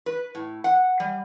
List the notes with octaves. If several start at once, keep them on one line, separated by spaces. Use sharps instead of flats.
B4
A2
F#5
G3